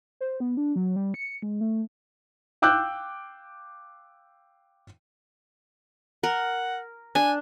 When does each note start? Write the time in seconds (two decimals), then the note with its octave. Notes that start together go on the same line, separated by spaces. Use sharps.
0.21 C5
0.40 B3
0.57 D4
0.76 F#3
0.96 G3
1.14 C#7
1.42 G#3
1.61 A3
2.62 F5 G5 D6 E6 F#6 G6
6.23 A#4 F#5
7.15 D4 G#5